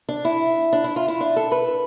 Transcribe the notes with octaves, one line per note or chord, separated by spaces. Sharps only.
D4
E4
D4
E4
F4
E4
D4
A4
B4